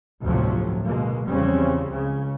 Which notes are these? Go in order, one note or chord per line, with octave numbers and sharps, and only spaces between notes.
G1 D2 A2 C3 F3 F#3
B2 D3 G#3 A#3
E2 C#3 F3 G3 C4 C#4
C#2 C#3